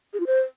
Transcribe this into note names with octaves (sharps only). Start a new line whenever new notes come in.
G#4
F4
C5